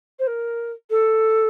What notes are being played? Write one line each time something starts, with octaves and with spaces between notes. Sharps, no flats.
C5
A#4
A4